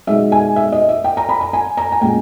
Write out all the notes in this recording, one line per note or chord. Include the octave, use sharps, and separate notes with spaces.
B2 G#3 B3 D#4 E5
G#5
E5
D#5
E5
G5
A#5
B5
A#5
G#5
A#5
G#5
A#2 G#3 C#4 G5